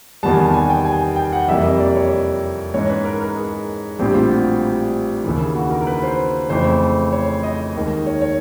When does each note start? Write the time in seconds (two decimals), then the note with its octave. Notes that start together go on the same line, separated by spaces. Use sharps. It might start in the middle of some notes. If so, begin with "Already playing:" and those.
0.23 E2 C3 D#3 G3 B3 A5
0.33 G#5
0.44 A5
0.54 G#5
0.70 G5
0.85 G#5
1.16 G5
1.33 F#5
1.48 F2 C3 E3 G3 A#3 E5
1.64 D#5
1.80 D5
1.96 C#5
2.74 G#2 E3 G#3 C#4 C#5
2.90 B4
3.05 A#4
3.20 A#4
3.37 G#4
3.99 A#1 A2 E3 G3 C4 G4
4.14 F4
4.30 F#4
5.24 D#2 C#3 E3
5.55 F#4
5.71 A#4
5.81 A#4
5.87 B4
6.03 C5
6.50 F2 C#3 E3 A3 C5
7.12 C#5
7.43 D#5
7.76 D#2 D#3 G#3
8.07 C#5
8.22 C#5